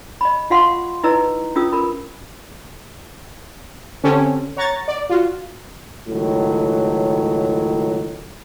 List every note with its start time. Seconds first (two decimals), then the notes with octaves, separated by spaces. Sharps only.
0.21 D#5 B5
0.50 F4 G4 F5 F#5 C6
1.03 D#4 E4 B4 D#5 A#5 E6
1.56 C#4 F4 G#4 D#6 E6
1.72 A#4 B5
4.03 D3 C4 C#4 G4 A4
4.57 C#5 F#5 A#5 C#6 A6
4.88 D5
5.10 F4 F#4
6.08 C#2 A2 D#3 F#3